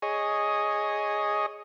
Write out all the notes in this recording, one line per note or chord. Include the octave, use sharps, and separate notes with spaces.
G#4 C#5 D#5